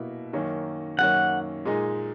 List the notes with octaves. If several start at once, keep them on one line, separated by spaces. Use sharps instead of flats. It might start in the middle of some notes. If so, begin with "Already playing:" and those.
Already playing: B2 A#3 E4
F#2 D#3 A#3 C#4
F#2 D#3 A#3 C#4 F#5
A#2 G#3 D#4 G#4